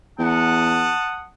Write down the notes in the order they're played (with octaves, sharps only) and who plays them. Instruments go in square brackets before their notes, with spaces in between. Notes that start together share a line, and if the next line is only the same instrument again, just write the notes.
[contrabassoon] E2 [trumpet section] F#5 A5 D#6